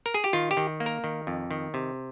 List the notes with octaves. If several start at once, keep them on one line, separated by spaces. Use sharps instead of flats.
A#4
G#4
G4
D#3 F4
G4
D#3
A#3
A#4
D#3
F2
D#3
C3